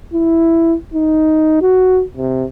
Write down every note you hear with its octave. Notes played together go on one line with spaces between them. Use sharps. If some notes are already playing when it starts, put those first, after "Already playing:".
E4
D#4
F#4
C3